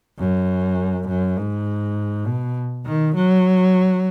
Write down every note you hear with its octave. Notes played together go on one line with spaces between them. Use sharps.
F#2
F#2
G#2
B2
D#3
F#3